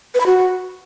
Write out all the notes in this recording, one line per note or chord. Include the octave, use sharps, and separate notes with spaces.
B4
B5
F#4